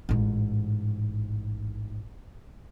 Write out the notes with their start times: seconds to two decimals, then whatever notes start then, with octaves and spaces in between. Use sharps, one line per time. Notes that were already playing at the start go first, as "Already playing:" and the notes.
0.09 A1 G#2